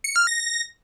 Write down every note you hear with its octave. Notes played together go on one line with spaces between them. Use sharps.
C#7
F6
A#6